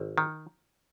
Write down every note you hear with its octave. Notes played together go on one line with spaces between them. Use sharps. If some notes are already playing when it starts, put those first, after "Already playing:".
Already playing: G#1
D#3